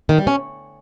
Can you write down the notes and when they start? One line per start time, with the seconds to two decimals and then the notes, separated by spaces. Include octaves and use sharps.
0.09 D#3
0.18 G3
0.27 C#4